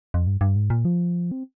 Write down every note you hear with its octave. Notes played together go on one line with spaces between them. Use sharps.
F2
G2
G2
G#2
A#2
F3
C4